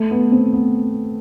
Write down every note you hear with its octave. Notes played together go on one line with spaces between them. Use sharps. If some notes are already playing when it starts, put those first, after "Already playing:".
Already playing: A3
B3
C4
B3